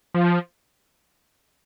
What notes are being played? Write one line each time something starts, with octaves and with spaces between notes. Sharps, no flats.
F3